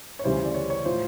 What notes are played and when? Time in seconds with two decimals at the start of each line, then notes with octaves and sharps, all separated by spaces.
0.19 C#5
0.24 D2 C#3 E3 G3 C5
0.45 D5
0.54 C#5
0.70 C#5
0.85 A2 F3 C5